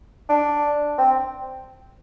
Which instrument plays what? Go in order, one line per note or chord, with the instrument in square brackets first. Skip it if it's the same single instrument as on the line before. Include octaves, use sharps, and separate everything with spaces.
[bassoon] D4
C4